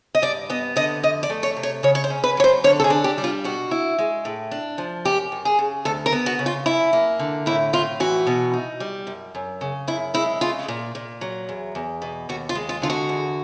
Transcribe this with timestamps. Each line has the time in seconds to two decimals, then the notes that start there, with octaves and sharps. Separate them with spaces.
0.15 D#5
0.22 G2 D5
0.50 B3 D#5
0.76 D3 D#5
1.03 F2 D#5
1.23 D5
1.30 A3
1.43 C#5
1.57 C3
1.63 C#5
1.83 C#3 C#5
1.95 C#5
2.04 C5
2.10 C#4
2.24 B4
2.37 F#3 C#5
2.44 C5
2.64 D3 C#5
2.80 A4
2.84 G#4
2.90 D4
3.04 G4
3.18 G3
3.24 F4
3.44 B2 F#4
3.71 E4
3.99 G#3
4.25 A2
4.51 D4
4.78 F3
5.05 F#2 G4
5.32 F#2
5.45 G#4
5.59 C#3
5.85 D2 A4
6.06 A#4
6.12 B3
6.26 F#4
6.39 C#3
6.46 F4
6.66 F#2 E4
6.93 A#3
7.20 D3
7.46 A2 E4
7.73 A2 F4
8.00 E3 F#4
8.27 B2
8.54 D#4
8.80 G3
9.07 F#2
9.35 F#2
9.61 C#3
9.87 F#2 E4
10.14 G#3 E4
10.41 C#3 F4
10.68 A#2
10.95 A#2
11.21 F#3
11.49 E2
11.75 E2
12.02 B2
12.29 D#2 F#4
12.49 F4
12.55 G#3
12.69 F4
12.82 D3 F4
12.90 F#4
13.09 E2